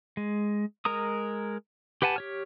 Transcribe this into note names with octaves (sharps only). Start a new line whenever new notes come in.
G#3
G#3 A#4 A#5 D#6
G4 B4 F#5 G#5 A5
G4 C#5 F6